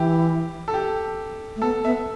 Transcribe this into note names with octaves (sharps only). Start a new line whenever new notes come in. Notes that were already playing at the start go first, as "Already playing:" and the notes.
Already playing: E3 G4
A4
G4
A3
B3 A4
B3 E5